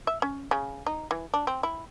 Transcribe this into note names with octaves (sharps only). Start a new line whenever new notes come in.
E5
C#4
C#3
D#4
E3
D4
C4
E4